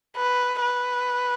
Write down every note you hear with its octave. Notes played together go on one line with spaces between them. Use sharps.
B4
B4